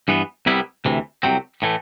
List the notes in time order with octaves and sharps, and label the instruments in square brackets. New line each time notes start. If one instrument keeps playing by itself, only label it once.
[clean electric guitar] G2 E3 B3
C2 C3 G3 B3 E4
D2 C3 E3
C2 C3 F#3 C4
A2 E3 A3